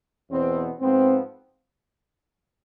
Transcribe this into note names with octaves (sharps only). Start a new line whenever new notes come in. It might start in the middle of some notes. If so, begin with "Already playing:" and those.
E2 B2 B3 C4
G#2 F3 B3 C4